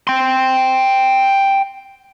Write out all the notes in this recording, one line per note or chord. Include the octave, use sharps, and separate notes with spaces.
G5 C6